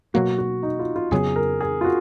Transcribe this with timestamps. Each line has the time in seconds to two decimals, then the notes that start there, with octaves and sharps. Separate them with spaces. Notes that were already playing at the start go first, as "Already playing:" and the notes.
0.14 B2 F#3 A#3 F#4
0.38 F#4
0.63 D#4
0.79 F4
0.96 F4
1.11 F2 C#3 F#3 B3 G#4
1.36 A#4
1.61 G#4
1.81 F4
1.84 F#4